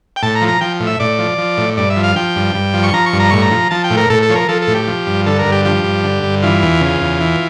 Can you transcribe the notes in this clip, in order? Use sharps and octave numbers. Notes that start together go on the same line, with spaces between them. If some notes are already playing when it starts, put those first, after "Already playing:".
G5
A2 A5
A#5
F3
A#5
F3 G5
A2
E5
A2 D5
F3
F3
A2
G2 D5
E5
F3
F5
F3 G5
G2
G2
F3
C#6
F3 A#5
C#6
G2
A#5
A2 C#6
A#5
F3
F3 A5
G5
A2
A#4
A2 A4
A4
F3 C#5
A#4
F3 A4
A4
A2
G4
F3
G2
D3 A4
A#4
G2
G4
F3 G4
G2
D3
G2
E3 F4
E2
C#3
E2
E3